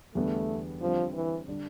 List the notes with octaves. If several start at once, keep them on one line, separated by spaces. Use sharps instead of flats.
E2 D3 G3 A3 B3
D3 F3 G3 C4
E3
D3 G3 D4